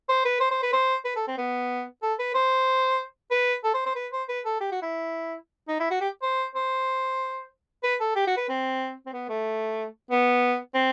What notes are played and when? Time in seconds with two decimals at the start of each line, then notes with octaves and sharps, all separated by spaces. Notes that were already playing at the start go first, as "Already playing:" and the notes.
0.09 C5
0.25 B4
0.40 C5
0.51 C5
0.63 B4
0.73 C5
1.05 B4
1.16 A4
1.28 C4
1.38 B3
2.03 A4
2.19 B4
2.34 C5
3.31 B4
3.64 A4
3.74 C5
3.86 C5
3.96 B4
4.12 C5
4.29 B4
4.45 A4
4.61 G4
4.72 F#4
4.82 E4
5.68 D#4
5.80 E4
5.91 F#4
6.01 G4
6.23 C5
6.55 C5
7.83 B4
8.01 A4
8.16 G4
8.27 F#4
8.37 B4
8.49 C4
9.06 C4
9.13 B3
9.29 A3
10.11 B3
10.74 C4